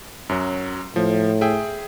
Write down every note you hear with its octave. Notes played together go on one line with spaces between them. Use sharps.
F#2 F#3
A2 F3
G#4 E5 G5